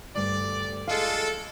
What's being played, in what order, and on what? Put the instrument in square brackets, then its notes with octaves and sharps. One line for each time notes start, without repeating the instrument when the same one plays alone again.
[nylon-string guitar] D2 G2 [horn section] D5
[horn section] G#3 F4 A4 [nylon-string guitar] F5